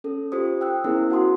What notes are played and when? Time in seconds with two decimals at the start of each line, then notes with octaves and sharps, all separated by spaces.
0.04 C#4 A4
0.32 F4 G4 C5 D#6
0.61 G5 E6 F#6
0.84 B3 C#4 E4 G#4 A#4 C5
1.10 F#4 F#5 A5 C6 D#6